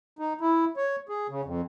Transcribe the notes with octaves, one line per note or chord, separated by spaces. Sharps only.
D#4
E4
C#5
G#4
C#3
F2